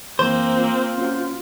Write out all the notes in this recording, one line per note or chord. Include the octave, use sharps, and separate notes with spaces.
F#2 E3 A#3 C4 C5
F4
C#4 F#4